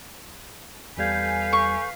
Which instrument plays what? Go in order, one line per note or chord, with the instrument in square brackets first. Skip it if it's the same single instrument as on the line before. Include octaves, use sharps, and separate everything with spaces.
[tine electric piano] E2 G3 G#6 [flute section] A4 G#5 G6 [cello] B4 F5
[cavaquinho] C#6